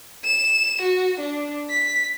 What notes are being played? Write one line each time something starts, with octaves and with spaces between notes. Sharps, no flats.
E7
F#4
D4
B6